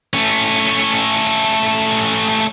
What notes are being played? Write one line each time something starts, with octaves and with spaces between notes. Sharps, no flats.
A3 C#4